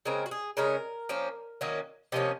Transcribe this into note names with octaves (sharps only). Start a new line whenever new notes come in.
C#3 G#3 C4 A#4
F#4
G#4
C#3 G#3 C#4 A#4
F3 A#3 C#4
D#3 F#3 A#3 C#4
C3 F3 A#3 C#4 D#5